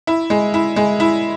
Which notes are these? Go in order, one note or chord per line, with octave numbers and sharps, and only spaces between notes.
E4
G#3
E4
G#3
E4